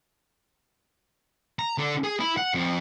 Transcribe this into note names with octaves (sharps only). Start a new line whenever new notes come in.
A#5
D3
G#4
E4
F#5
F2